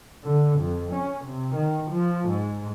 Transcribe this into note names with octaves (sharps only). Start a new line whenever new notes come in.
D3
F2
C#4
C3
D#3
F3
G#2